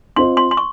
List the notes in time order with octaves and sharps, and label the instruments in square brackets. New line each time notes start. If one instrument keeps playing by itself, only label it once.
[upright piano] C4 F4 C5 D#5 [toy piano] C6
[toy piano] C6
C6
C#6